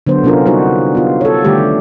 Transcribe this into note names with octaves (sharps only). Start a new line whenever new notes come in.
D3 F#3 B3 C5
C3 B3 C#4 D4 F4 A#4
G3 D#4 F#4 C5
B3 F4
A4 C#5
D3 D#3 G3 A3 G4